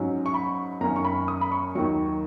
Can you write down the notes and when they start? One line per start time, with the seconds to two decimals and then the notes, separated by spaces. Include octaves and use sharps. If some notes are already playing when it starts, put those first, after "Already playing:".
Already playing: G#2 F#3 C#4
0.26 C#6
0.34 B5
0.81 F#2 D#3 A#3 C#4 A#5
0.96 C#6
1.05 B5
1.28 D#6
1.41 B5
1.52 C#6
1.75 D#2 D#3 F#3 C#6